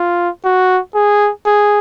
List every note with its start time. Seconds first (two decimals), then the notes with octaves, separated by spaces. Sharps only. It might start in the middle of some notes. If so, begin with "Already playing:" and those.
Already playing: F4
0.44 F#4
0.95 G#4
1.46 G#4